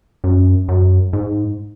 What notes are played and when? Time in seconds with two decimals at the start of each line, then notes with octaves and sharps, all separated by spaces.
0.24 F#2
0.69 F#2
1.13 G#2